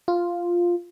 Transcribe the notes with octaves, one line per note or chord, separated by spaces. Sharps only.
F4